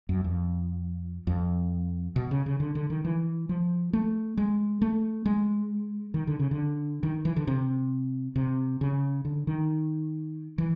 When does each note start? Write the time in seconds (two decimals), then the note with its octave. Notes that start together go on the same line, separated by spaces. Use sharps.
0.09 F#2
0.24 F2
1.27 F2
2.16 B2
2.31 C#3
2.46 C#3
2.60 D3
2.75 D3
2.90 D#3
3.05 E3
3.49 F3
3.93 A3
4.37 G#3
4.82 A3
5.26 G#3
6.14 D#3
6.27 D3
6.39 C#3
6.51 D3
7.03 D#3
7.25 E3
7.36 D3
7.47 C3
8.36 C3
8.81 C#3
9.25 D3
9.47 D#3
10.58 E3